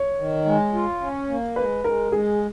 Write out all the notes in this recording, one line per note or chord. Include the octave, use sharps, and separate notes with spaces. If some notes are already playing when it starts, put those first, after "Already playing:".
Already playing: C#5
D#3
G#3
F4
C#4
A#3
G#3 B4
G#3 A#4
G#3 G#4